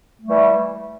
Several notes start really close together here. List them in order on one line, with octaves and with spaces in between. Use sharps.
A3 G3 E3